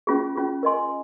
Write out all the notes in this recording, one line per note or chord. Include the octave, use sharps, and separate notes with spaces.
C#4 F4 G#4
C#4 F4 G#4
A#4 D#5 G#5 C6